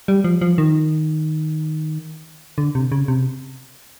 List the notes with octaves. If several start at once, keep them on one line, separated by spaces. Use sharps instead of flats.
G3
F3
F3
D#3
D3
C3
C#3
C3